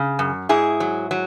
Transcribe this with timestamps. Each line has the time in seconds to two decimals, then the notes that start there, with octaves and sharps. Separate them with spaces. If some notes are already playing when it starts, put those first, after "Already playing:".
Already playing: C#3
0.19 F#2
0.49 G#2 E4 G#4
0.80 F#3
1.11 F#3